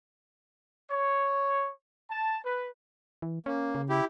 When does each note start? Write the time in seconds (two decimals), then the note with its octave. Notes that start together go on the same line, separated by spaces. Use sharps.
0.91 C#5
2.11 A5
2.43 B4
3.22 E3
3.46 A#3 C#4
3.75 C#3
3.89 E4 G4